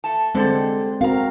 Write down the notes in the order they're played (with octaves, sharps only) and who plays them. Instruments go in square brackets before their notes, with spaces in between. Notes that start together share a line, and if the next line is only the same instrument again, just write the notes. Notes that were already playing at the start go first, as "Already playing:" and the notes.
[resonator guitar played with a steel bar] A3 A5
[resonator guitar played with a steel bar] D3 G3 A4 [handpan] G#3 C4 C5
[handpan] C4 F#4 A#4 [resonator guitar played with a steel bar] F5 A#5